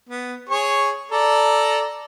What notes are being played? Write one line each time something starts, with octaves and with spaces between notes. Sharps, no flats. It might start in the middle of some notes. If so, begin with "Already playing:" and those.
B3
G#4 C#5 C#6
A4 D5 A#5